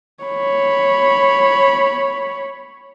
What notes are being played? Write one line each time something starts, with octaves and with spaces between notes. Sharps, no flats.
C#5 B5